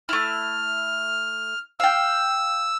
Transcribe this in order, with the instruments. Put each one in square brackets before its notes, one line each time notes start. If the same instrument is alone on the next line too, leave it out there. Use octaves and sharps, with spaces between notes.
[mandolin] A3 E4 [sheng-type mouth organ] F6
[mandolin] F5 G5 [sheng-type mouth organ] E6